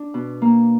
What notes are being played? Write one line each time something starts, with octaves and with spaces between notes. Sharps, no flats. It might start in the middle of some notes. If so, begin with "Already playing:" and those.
Already playing: D4
B2
A#3